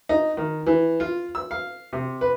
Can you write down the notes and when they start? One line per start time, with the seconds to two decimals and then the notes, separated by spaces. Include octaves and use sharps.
0.09 D#4
0.37 D#3
0.67 E3
1.00 F4
1.35 E6
1.51 F5
1.93 C3
2.21 B4